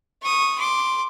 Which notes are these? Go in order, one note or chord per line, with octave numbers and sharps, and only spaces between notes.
C#6 D#6
C6 D6